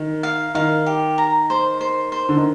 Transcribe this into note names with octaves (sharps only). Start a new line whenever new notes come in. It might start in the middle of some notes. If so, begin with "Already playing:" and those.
Already playing: D#3
F5
D#3 F5
G4
A#5
C5
C5
C5
D3
D#3